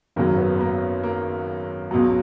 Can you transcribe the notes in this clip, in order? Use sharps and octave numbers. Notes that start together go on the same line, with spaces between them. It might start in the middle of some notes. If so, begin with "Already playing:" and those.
G#1 F#2 C#3 F#3 A#3
B3
B3
A#3
A#3
C#2 B2 F#3